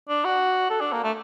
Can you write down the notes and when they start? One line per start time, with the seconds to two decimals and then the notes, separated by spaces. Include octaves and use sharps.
0.09 D4
0.25 F#4
0.70 A4
0.81 D4
0.92 A#3
1.04 A3